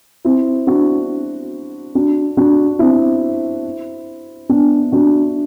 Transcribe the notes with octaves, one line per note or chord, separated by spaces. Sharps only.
C4 E4
D4 F#4
D4 F#4
D4 F#4
C4 E4
B3 D4
D4 F#4